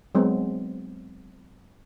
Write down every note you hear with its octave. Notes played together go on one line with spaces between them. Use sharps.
F#3 G#3 B3 C4